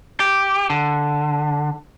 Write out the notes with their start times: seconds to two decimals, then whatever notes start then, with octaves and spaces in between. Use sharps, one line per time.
0.20 G4
0.70 D3